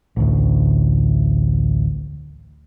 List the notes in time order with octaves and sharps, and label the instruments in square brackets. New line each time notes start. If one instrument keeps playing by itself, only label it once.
[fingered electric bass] A1 D2